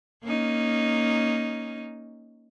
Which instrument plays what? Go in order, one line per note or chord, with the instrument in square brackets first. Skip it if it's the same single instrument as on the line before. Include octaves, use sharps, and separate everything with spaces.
[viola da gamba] A#3 C#4 D#4